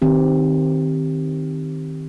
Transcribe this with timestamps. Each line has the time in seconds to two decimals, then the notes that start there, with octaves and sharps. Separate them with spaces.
0.02 D#3 C4 G4